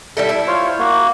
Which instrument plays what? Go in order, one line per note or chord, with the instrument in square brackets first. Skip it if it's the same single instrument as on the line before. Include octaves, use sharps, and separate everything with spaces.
[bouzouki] G3 E4 A4
E4
[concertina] F4 C5 C#5
A#3 F#4